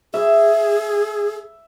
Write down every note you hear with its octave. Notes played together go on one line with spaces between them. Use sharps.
G#4 E5